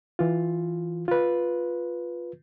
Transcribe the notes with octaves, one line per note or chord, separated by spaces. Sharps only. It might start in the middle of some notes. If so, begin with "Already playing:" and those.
E3 F4
F4 B4